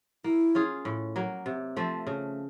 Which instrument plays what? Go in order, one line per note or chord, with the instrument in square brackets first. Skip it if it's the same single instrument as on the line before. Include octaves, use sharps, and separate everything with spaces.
[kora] A#3 [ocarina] E4
[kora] C#4 F4 G#4
A2
F#3 A#3
C3
F3 A3 C4
C#3